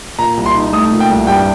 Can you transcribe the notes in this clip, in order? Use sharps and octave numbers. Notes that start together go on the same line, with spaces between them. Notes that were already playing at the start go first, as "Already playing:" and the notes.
A#2 A#5
C2
C6
D#4
A3 D#6
A#2
G5
C2
G2 G5